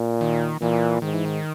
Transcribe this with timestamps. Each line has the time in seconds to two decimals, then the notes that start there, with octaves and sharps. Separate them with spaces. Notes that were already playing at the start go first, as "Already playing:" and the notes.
Already playing: A#2
0.21 D#3
0.61 A#2 E3
1.02 G#2 D#3
1.14 E3
1.25 D#3